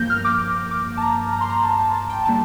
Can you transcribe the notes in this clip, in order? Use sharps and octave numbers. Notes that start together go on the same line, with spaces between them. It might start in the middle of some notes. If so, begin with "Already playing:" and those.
Already playing: G2 F3 A#3 G6 A#6
F6
D6
D6
A5
A#5
A#5
C6
A#5
A5
A5
A5
G5
D3 G3 A#3 A5